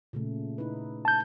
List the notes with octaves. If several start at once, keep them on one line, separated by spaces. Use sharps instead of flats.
A#2 C#3 A3
D#4 E4 B4
A5 G6